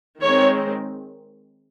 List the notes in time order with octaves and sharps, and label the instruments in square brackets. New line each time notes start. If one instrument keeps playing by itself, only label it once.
[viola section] D#3 G#3 C4 C#5